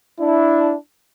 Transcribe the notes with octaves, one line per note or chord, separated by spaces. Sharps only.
D4 E4